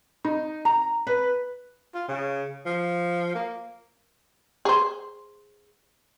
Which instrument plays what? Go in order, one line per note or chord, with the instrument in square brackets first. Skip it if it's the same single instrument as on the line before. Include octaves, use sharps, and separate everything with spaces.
[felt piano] D#4
A#5
B4
[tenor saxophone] F4
C#3
F3
A#3
[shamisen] G#4 C5